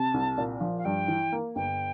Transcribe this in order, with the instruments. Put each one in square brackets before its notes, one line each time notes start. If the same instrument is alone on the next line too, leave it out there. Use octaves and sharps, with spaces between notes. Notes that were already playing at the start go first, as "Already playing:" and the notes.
Already playing: [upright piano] C3 [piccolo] A5
[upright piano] C2
A#2
F3
[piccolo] F5
[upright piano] G2 [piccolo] G5
[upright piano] E3
A#3
[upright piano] G1 [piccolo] G5